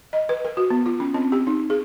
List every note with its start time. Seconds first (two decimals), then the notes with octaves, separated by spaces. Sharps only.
0.13 D#5
0.29 B4
0.45 A#4
0.57 F#4
0.70 B3
0.86 F4
1.00 C#4
1.14 C4
1.32 G4
1.47 D#4
1.70 G#4